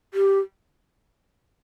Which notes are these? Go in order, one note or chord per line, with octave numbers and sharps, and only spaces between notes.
G4